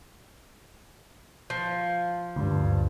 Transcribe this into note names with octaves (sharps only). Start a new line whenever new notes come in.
F3
D2 G2